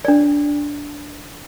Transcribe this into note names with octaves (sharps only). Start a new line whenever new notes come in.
D4 D5